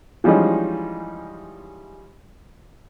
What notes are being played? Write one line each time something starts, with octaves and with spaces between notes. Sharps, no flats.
E3 F3 G3 G#3 C#4 D#4